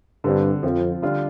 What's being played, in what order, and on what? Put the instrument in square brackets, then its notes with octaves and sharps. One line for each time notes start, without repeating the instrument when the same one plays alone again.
[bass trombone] G2 [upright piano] D3 G3 C4
[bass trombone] F2 [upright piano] F3 C4 F4
[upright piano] D3 G3 D4 F4